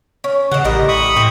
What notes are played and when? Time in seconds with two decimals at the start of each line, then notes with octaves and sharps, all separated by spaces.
0.24 C#4
0.52 C#3 D#5 F#5
0.64 A1 G3 A#4 D#5
0.88 B5 C#6 D#6
1.16 A2 C4